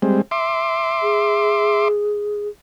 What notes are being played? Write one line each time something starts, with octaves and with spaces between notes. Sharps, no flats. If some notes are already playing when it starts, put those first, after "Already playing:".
G3 G#3 C4
E5 C6 D6
G#4